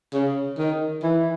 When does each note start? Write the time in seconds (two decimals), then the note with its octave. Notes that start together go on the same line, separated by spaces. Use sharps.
0.14 C#3
0.58 D#3
1.03 E3